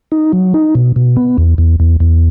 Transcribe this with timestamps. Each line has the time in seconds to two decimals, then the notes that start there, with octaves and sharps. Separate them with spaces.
0.12 D#4
0.33 F#3
0.54 D#4
0.75 B2
0.96 B2
1.16 B3
1.38 E2
1.58 E2
1.80 E2
2.00 E2